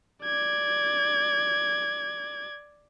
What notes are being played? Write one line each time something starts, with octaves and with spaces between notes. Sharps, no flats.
D5 G#6